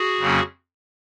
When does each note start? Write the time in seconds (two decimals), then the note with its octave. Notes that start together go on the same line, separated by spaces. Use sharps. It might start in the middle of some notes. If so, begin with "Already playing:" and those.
Already playing: F#4 G#4
0.19 F2 C#3 F#3 A#3 C#4